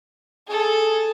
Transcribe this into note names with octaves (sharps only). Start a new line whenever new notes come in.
G#4 A4